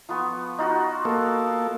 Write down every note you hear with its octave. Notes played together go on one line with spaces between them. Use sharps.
F3 B3 C#6
D#4 F4 F#4
A#3 A4